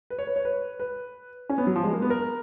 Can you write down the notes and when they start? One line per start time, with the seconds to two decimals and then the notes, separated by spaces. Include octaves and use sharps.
0.10 B4
0.19 C#5
0.27 B4
0.36 C#5
0.45 B4
0.80 B4
1.50 C#4
1.58 B3
1.67 F#3
1.76 F3
1.84 G#3
1.93 A#3
2.02 B3
2.10 A#4